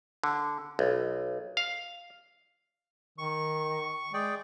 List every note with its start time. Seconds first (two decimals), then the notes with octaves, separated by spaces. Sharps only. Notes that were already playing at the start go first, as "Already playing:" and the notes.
0.24 D3
0.79 B1
1.57 F5
3.18 D#3 C#6
4.14 G#3 G#4 D5 G5